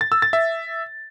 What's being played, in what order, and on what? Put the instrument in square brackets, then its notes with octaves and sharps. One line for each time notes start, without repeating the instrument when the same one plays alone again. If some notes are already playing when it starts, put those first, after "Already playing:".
[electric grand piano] A6
E6
A6
E5